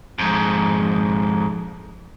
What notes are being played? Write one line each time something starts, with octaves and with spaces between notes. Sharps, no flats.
F2 G#2